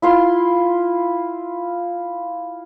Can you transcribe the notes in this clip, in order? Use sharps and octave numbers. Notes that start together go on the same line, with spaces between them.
E4 F4 C6